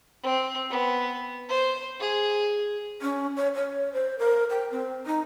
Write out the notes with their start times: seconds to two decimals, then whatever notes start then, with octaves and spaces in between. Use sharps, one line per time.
0.23 C4
0.70 B3
1.48 C5
2.00 G#4
3.02 C#4
3.36 C#5
3.55 C#5
3.93 C5
4.19 A#4
4.50 G5
4.71 C4
5.06 D#4